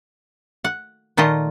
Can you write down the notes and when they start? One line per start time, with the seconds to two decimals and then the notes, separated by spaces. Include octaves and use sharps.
0.64 F#5
1.17 A#2 D#3 A3 F4 D#5